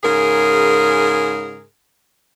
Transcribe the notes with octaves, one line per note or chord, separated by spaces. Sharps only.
G#2 C#3 G#4 A#4